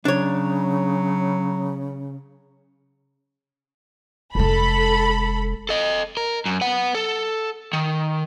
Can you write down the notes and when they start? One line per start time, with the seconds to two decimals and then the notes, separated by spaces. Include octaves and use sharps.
0.05 C#3 F#3 D4 C#5
4.35 F1 G#3 A4 B5
5.69 A4 D#5
6.17 A#4
6.46 F#2
6.61 B4 F#5
6.95 A4
7.73 D#3